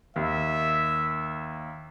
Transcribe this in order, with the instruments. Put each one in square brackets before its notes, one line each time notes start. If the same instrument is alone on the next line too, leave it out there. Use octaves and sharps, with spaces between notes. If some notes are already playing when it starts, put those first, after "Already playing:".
[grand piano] D#2 [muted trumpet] E5